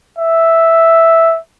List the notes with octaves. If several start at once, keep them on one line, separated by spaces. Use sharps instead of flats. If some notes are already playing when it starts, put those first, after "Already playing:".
E5